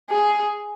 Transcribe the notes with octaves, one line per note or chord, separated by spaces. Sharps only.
G#4